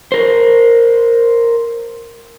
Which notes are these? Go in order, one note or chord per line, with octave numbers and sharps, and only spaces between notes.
A#4 C5